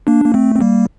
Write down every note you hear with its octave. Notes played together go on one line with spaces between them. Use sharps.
A#3 D4
A#3
A3 C4
C4
G3 A#3